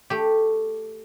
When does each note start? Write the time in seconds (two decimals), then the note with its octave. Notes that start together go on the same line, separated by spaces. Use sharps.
0.10 A3 G4